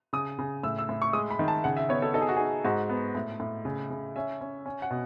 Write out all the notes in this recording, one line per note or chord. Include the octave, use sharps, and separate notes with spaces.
C#3 D#6
C#3
A2 E6
E6
A2
C#6
G#3 D#6
B5
D#3
A5
C#3 F#5
E5
B3 C#5
A4
D#4 A4
G#4
F#4
D#4 G#4
G#2 F#4
B3
A2
A2
C#3
C#3
C#4 E5
C#4
C#4
F#5
B2